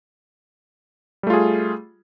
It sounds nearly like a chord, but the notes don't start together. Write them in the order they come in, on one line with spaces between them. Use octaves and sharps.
G3 A3 F4 G#4